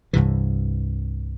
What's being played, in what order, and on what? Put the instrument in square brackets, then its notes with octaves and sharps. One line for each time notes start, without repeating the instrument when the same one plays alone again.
[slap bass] C2 G2 C3 E3